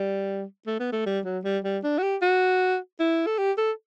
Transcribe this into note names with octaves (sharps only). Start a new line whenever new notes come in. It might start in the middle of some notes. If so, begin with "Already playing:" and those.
Already playing: G3
A3
B3
A3
G3
F#3
G3
G3
D4
F#4
G4
F#4
E4
A4
G4
A4